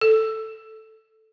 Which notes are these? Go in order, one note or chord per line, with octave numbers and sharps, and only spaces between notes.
A4